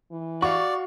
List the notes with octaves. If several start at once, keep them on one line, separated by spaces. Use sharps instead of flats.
E3
F#4 D5 F5 C#6